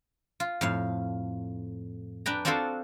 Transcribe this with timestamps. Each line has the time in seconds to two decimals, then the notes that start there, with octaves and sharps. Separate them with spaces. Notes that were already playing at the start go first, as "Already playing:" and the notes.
0.40 F4
0.61 F2 A2 F5
2.26 D4 B4 G5 A#5
2.45 C4 D4 F4 F#4 A4 C5